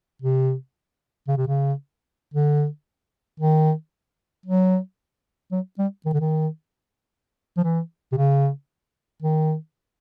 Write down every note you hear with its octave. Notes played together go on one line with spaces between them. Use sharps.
C3
C#3
C3
C#3
D3
D#3
F#3
F#3
G3
D#3
D3
D#3
F3
E3
C3
C#3
D#3